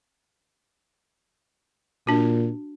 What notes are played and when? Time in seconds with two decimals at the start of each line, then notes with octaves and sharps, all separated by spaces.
2.07 A#2 D4 F#4